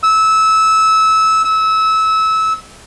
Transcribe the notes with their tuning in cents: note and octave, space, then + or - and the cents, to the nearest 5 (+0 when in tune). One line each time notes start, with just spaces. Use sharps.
E6 -20
E6 -25